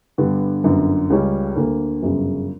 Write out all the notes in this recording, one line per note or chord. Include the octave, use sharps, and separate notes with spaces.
G2 D3 G3 B3
G1 F#2 D3
C#2 C#3 G3 C#4
D2 D3 A#3
G1 F#2 C#3